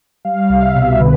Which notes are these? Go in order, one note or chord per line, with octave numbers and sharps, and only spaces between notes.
G3 F5
F5
C2
E5
B2
D3 B4